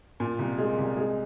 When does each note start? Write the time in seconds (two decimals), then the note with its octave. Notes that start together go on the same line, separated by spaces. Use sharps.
0.20 A#2
0.39 C2
0.58 G#3
0.78 C2
0.97 G#3